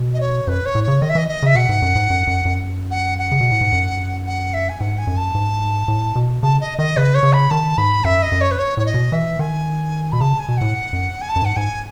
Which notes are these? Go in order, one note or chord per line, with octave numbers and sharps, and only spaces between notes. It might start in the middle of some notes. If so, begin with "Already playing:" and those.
Already playing: B2
D#5
C#5
F#2 B4
C#5
A2
C#3 C#5
D#3 D#5
E5
E3 D#5
D#5
C#3 E5
B2 F#5
G#2
F#2
G#2
F#2
F#2
F#2
F#5
F#5
C#3
B2
A2
G#2
F#2
F#5
E5
G#5
G#2 F#5
G#5
F#2
A5
G#2
A2
B2
C#3 A5
D#5
D#3 D#5
C#3 B4
C#5
C#3
B5
D#3 A5
G#2 B5
F#2 E5
D#5
F#2
C#5
B4
C#5
A2 C#5
D#5
B2
E3 E5
D#3 G#5
B2 B5
C#3 A5
G#5
B2
A2 F#5
F#2
G#5
A5
F#2
G#2 F#5
G#2 G#5